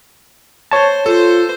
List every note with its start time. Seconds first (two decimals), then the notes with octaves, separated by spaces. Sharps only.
0.71 C5 C#5 A5
1.06 F4 A4 C5